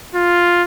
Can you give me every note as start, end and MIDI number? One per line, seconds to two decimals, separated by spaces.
0.15 0.63 65